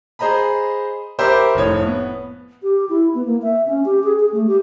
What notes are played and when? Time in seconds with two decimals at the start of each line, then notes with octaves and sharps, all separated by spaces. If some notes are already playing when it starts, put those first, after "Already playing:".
0.19 G#4 C5 D#5 A#5 B5
1.19 G4 A#4 C5 E5 B5 D6
1.55 F1 A2 C#5 D#6
1.86 B3
2.63 G4
2.89 E4
3.14 B3
3.26 A#3
3.42 E5
3.66 C#4
3.85 G4
4.04 G#4
4.19 G#4
4.32 A3
4.47 G4